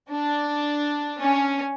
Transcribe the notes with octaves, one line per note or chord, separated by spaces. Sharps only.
D4
C#4